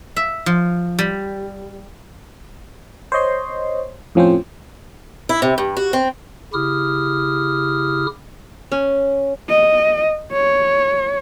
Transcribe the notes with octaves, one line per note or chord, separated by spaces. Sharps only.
E5
F3
G3
C5 C#5 D#5 C6
F2 A2 F3 C4 C#4 C5
E4
C3
G2
F#4
C4
C#3 E4 G4 D#6 F6
C#4
D#5
C#5